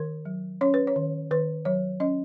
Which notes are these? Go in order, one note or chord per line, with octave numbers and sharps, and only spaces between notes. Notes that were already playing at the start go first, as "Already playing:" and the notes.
Already playing: D#3 A#4
F#3
C#4 C#5
B4
C#5
D#3
D#3 B4
F#3 C#5
C#4 D#5